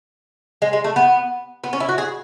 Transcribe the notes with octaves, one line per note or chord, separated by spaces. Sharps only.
G#3
G#3
A3
B3
B3
C#4
E4
F#4
G#4